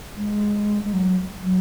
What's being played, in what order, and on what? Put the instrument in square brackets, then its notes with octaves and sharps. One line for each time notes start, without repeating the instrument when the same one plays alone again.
[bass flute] G#3
G#3
F#3
F#3